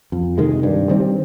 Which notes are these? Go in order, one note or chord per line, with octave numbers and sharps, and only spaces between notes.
F2
C3 D#3 G#3
G2
D#3 G3 C4